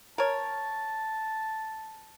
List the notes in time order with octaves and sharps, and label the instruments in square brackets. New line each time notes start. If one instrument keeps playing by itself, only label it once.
[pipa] A#4 C#5 [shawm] A5